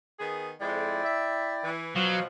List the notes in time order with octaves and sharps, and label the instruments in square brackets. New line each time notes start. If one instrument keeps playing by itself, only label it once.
[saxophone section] D#3 B3 G#4
[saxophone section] F2 G#3 [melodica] E4 D5 G5
[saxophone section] E5
E3
[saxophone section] B2 F3 [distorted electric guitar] F#3 [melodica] F#4 F5